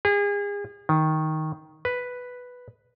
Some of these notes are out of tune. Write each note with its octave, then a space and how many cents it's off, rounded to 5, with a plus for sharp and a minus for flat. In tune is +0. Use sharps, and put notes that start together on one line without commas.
G#4 -35
D#3 +10
B4 +0